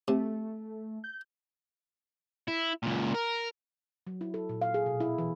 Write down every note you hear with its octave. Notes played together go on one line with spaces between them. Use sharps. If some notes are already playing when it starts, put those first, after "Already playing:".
C3 A3
G6
E4
C#2 A#2
A#4
F#3
E4
A4
A#2
F5
G#4
B2
E4
E3